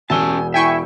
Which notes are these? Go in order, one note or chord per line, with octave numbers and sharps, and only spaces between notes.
E1 C#4 G4 G#5 A5 E6 G7
E4 E5 G5 G#5 C#6